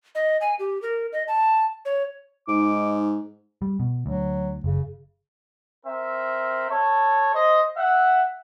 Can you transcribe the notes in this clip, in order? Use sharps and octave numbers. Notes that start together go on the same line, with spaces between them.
D#5
G#5
G4
A#4
D#5
A5
C#5
G#2 D#4 D6
G3
B2
D2 F#3
F#1 C#3
C4 A#4 E5
A4 C#5
C5 D#5
E5 F#5